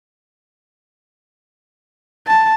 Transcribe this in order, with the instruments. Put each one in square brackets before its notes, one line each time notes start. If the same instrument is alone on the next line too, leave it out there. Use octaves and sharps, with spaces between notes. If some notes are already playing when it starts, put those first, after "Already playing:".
[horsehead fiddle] A5